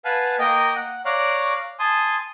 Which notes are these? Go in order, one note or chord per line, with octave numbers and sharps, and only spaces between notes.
B4 F5 F#5 G#5 A5
A#3 A#4 D#5 G5
F#5
C#5 D5 F5 A#5 F#6
G#5 A5 C6 D#6